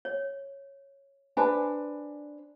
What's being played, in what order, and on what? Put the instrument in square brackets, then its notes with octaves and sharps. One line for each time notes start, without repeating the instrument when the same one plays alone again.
[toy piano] C#5
[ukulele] D4 B4 C5 [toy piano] G#5